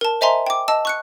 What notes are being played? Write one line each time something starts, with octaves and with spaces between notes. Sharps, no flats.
A#4 A5
C5 D#5 E5 G#5 A#5 C6
G5 D6
D#5 A5 E6
C#6 F#6 C#7